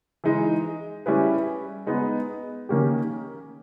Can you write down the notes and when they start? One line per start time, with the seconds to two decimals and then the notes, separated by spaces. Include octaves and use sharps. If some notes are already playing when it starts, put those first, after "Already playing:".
0.24 E3 G#3 D#4
1.06 G3 C#4 E4 G#4 B4
1.87 G#3 B3 D#4
2.69 D#3 A#3 C#4 G4